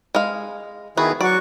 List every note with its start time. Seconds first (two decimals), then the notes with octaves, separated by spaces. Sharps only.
0.15 G#3 F5
0.97 D#3 B3 E4 F#4 G#4
1.21 F#3 F#4 D5 F#5 C#6